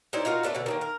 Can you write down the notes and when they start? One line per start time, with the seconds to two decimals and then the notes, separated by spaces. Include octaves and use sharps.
0.13 D#4 E4 C5 D5
0.25 D#4 F4 F#4 A#4
0.43 A3 D4 F4 A4
0.54 B2 D3
0.66 D#3 G3 A#3
0.81 A#4